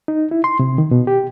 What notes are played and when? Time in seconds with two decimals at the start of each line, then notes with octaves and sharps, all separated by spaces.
0.08 D#4
0.31 E4
0.44 C6
0.60 C3
0.78 D#3
0.91 B2
1.07 G4